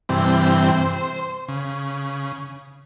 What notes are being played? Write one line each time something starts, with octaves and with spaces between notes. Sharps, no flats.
G2 C3 E3 C4 G5
C5
C#3